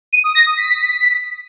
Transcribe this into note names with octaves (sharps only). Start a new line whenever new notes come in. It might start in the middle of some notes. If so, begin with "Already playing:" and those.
D#7
D#6
A#6
D#6
B6